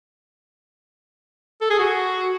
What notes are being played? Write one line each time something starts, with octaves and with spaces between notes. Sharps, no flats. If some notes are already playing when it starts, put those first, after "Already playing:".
A4
G#4
F#4